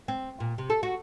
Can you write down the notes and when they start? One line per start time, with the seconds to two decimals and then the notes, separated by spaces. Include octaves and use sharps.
0.08 C4
0.40 A#2
0.58 C3
0.70 A4
0.83 F#4